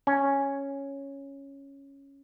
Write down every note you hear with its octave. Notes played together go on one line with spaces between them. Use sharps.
C#4